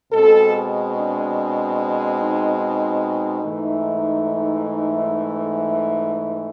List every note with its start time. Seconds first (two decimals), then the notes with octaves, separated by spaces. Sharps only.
0.13 B2 G#3 C4 A4
0.54 G#4
0.96 D4
1.77 D4
2.18 D#4
2.60 D#4
3.42 G#2 E3 A3